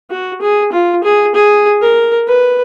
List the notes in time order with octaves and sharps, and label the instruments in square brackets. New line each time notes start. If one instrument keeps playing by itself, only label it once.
[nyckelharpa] F#4
G#4
F4
G#4
G#4
A#4
B4